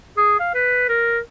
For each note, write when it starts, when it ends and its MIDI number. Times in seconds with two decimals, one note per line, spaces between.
0.17 0.37 68
0.39 0.50 77
0.54 0.87 71
0.89 1.19 70